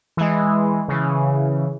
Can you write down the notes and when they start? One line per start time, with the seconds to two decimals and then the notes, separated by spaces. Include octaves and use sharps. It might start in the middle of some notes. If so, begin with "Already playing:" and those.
0.17 E3 G#3
0.88 C#3 E3